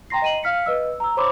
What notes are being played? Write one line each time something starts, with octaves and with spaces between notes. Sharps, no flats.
G5 A#5 C6 A#6 C7
D#5 D#7 F#7
F5 F6 B6 C#7
B4 D#5 E6
A#5 E6
C5 C#5 B5 C6 D6